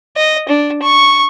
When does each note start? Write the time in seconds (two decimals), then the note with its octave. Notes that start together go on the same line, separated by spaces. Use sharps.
0.16 D#5
0.49 D4
0.82 C#6